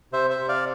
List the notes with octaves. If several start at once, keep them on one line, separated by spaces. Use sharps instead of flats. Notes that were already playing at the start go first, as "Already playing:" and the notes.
C3 C5 E5
C5 E5
C3
D5 F5